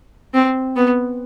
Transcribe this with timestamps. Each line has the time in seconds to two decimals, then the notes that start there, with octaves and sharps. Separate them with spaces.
0.34 C4
0.76 B3